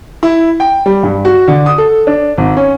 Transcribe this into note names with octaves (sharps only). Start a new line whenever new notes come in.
E4
G5
G3
G2
F#4
D3
D#6
A4
D4
G#1
C#4